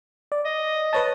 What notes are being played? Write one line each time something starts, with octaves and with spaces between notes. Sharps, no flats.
D5
D#5
B4 C#5 A5